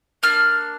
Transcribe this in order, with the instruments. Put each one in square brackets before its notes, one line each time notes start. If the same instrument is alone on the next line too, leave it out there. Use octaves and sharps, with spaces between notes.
[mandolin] A#3 D4 F6